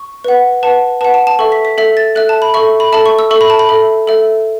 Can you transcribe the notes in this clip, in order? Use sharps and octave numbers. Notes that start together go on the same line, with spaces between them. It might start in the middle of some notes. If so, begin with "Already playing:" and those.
Already playing: C#6
B4 F#5
B4 F#5 A5
B4 F#5 A5
A5
A5
A4 E5 C#6
B6
B6
A4 E5 B6
A6
A4 E5 F#6
A5
B5
A4 E5 C#6
B5
A4 E5 A5
C#6
E6
A4 E5 C#6
B5
A5
B5
A4 E5
A4 E5